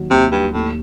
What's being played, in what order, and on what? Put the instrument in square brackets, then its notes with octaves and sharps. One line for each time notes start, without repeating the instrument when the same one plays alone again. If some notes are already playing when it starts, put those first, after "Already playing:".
Already playing: [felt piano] D#2 D#3 F#3
[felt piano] D#2 [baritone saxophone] C3
[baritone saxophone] G2
[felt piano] D#2 [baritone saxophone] A2